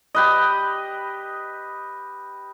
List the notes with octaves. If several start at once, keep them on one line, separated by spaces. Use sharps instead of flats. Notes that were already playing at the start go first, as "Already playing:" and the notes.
G4 B4 D#5